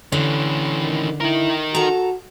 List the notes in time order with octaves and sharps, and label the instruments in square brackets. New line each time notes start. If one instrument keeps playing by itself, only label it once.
[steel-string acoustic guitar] D3 [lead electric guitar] E3 C#4
[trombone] D#3
[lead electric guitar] D#4 A#4 [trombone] E4
[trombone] F#4 [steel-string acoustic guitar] A4 A#5